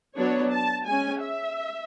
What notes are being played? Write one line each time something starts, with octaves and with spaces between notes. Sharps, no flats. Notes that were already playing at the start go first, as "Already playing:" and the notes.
F#3 B3 D4 C#5
A5
G#3 C#4 G#5
E5